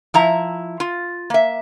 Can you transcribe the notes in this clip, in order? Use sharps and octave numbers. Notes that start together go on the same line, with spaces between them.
F3 E4 A#5
F4
A#3 E5